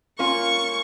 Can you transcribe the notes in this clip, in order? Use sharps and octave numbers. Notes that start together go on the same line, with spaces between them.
A#3 C#4 F4 C#6